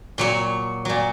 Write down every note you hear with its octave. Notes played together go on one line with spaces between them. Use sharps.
A#2 F#3 C#5
A#2 F#3